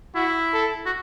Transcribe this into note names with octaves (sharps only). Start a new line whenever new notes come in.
E4 F#4
A4
F#4